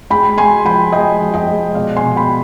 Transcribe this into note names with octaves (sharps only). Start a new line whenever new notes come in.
G#3 G5 B5
G#3 G#5 C6
F3 G5 B5
G#3 D#5 G5
F3
D#5 G5
G#3
B2 D5 F5
G#5 C6
B2
G5 B5